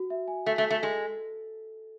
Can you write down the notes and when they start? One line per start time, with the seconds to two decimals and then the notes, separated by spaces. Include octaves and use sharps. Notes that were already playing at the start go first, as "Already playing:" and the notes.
Already playing: F#4
0.10 E5
0.28 G#5
0.46 A3 E5
0.58 A3
0.65 A4
0.70 A3
0.82 G#3 A4